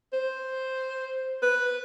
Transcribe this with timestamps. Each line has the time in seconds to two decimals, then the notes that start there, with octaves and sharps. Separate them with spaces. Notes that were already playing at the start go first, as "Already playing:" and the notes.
0.13 C5
1.43 B4